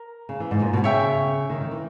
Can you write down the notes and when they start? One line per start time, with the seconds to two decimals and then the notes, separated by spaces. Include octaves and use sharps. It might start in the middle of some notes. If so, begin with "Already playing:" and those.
Already playing: A#4
0.29 C#3
0.40 E3
0.51 G#2
0.61 A#2
0.73 B2
0.84 C#3 C#5 E5 G5
1.50 D#3
1.61 D#3
1.71 E3